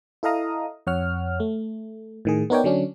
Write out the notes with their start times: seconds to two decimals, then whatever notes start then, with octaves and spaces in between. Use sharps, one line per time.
0.23 E4 A4 D#5 F5 A#5 D#6
0.87 F2 C#5 F#5 F6
1.40 A3
2.25 A2 D#3 G#4
2.50 B3 D#4 A#4 C#5 D5 G5
2.64 D3 F#3 C#4 D4